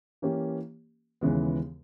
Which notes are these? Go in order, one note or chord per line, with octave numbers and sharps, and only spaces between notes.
E3 A#3 C#4 G4
D#2 C#3 E3 G#3 B3